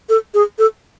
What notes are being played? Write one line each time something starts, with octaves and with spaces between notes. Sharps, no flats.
A4
G#4
A4